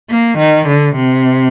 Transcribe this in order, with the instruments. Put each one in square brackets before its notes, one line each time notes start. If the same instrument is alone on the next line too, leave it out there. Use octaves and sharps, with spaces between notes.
[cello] A#3
D#3
D3
C3